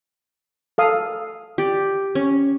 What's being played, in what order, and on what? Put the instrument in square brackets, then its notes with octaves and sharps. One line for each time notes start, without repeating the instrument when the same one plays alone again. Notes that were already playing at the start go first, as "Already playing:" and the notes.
[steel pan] A4 F5 D#6
[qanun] G4 D5
C#4